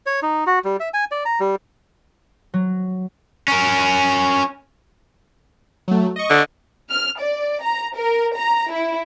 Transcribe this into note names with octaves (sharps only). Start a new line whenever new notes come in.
C#5
D#4
F#4
G3
E5
G#5
D5
A#5
G3
F#3
C#4 A#4
F#3 A3
D#5 C#6
D3
F6
D5
A#5
A#4
A#5
E4